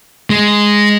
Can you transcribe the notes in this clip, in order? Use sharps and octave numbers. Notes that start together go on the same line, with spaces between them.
G#3